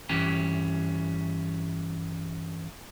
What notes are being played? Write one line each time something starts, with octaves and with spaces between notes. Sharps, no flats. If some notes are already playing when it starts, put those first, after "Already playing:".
G2 E3 C#4 G4